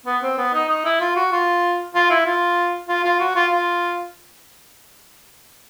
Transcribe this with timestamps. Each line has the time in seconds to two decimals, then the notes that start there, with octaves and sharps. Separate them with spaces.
0.06 B3
0.23 C4
0.38 B3
0.53 D#4
0.69 D#4
0.85 E4
1.00 F4
1.16 F#4
1.32 F4
1.95 F4
2.10 E4
2.26 F4
2.88 F4
3.05 F4
3.20 F#4
3.35 F4
3.52 F4